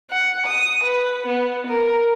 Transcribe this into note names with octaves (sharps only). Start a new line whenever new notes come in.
F#5
D#6
B4
B3
A#4